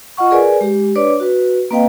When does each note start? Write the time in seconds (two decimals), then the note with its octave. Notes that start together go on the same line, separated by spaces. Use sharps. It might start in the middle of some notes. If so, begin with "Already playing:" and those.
0.17 F4 D#5 F#5 C#6
0.31 G#4 A#4 B4 D5 G#5
0.61 G#3 G4
0.95 D4 B4 C#5 D5 D6
1.20 F#4 B4
1.71 A#3 C4 B4 D#5 F5 G5